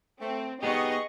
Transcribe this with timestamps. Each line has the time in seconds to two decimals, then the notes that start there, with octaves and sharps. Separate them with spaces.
0.21 A3 C4
0.63 B3 D#4 G4 G#4 D#5 C#6